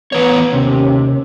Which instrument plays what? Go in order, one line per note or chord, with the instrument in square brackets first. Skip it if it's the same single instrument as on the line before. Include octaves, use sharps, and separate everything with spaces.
[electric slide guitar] A2 E3 C#5 [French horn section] B3
[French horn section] D#2 C#4 [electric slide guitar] C3